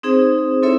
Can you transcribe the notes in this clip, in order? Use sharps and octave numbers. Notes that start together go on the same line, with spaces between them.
C4 D#4 G#4 C5
C4 E4 A4 C#5 E5